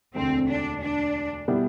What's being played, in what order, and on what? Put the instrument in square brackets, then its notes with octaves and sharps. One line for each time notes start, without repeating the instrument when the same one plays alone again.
[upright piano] E1 D2 D3 [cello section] C4
[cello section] D4
D4
[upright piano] B2 G3 B3 E4 G4